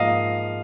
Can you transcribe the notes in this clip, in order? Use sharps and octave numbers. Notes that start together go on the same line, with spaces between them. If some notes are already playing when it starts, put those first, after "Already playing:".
Already playing: G#2 F3 A#3 D#5 F5